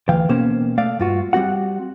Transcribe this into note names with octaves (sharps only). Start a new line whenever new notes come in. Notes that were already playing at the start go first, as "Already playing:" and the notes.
D2 E3 F5 G5
B2 A#3 C#4 C5
A3 D5 F5
G2 F4 F#4
G3 C4 F#4 F#5